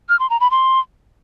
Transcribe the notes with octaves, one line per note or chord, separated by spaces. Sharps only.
F6
C6
A#5
B5
C6